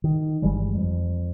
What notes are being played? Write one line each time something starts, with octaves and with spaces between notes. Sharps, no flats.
D#3
G1 E3 G3 G#3
F2